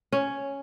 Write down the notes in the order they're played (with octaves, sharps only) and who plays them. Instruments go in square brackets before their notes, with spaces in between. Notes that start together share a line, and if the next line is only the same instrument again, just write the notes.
[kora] C#4